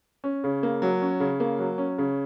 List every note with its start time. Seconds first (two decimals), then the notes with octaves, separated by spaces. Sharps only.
0.24 C#4
0.44 C#3
0.63 A#3
0.82 F#3
1.02 C#4
1.20 C#3
1.40 A#3
1.59 F#3
1.78 C#4
1.98 C#3